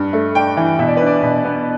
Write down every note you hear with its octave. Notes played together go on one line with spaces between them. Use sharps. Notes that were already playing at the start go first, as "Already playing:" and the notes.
Already playing: G2
A3
D4 G5
E3
B2 E5
D5
B4
D4
D5
B2
B3